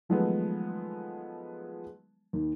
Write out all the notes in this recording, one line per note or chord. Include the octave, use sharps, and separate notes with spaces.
D#3 F3 F#3 G#3 A3 B3
D#2 D#3